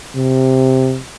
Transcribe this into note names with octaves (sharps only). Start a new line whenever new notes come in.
C3